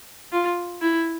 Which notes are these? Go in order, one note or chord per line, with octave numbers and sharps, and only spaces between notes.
F4
E4